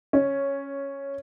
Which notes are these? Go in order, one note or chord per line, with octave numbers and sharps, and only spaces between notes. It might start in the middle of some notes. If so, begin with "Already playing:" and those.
C#4